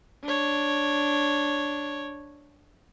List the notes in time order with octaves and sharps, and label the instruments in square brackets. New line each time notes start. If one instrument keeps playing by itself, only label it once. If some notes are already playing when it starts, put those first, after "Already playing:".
[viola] D4 C#5